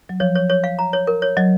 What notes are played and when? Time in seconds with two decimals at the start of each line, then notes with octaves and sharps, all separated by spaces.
0.09 F#3
0.20 F3 C#5
0.35 C#5
0.50 C#5
0.64 F5
0.79 A#5
0.93 C#5
1.07 A#4
1.22 C#5
1.37 F#3 D#5